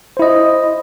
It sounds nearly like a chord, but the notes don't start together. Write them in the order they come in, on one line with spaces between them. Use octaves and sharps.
C5 E4 D#5